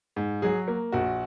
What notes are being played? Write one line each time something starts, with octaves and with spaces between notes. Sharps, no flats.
G#2
F#3 G#4
A#3
A#1 F#4